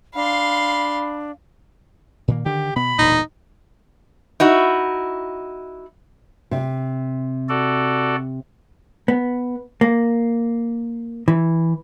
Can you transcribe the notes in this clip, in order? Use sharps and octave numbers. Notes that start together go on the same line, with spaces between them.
D4 F5 B5 C6
A#2 D#3 A#3
D3 D#3 G4
B2 B3 B5
E1 D2 A#2 D#4
D#4 E4 F#4
C3
F#4 A4 D5
B3
A#3
E3